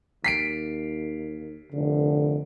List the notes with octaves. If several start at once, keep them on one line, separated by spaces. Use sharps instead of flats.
D#2 B6 C7 D7
F1 D3